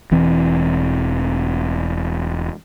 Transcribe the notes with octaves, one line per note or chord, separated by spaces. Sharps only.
E1 E3 C4